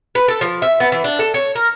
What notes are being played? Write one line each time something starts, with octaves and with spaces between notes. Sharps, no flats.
B4
A4
F3
E5
B3
E3
D4
A4
C#5
A#4